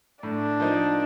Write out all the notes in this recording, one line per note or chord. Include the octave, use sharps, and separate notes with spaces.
A2 D4
F3 A#3 D#4